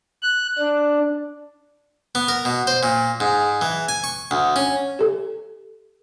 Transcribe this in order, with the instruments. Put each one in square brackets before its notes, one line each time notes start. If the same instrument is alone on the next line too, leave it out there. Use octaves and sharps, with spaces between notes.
[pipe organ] F#6
D4
[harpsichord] B3
A#4
B2
C5
A#2
G#2
E3
G#5
C#6
D2
C#4
[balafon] G4 A4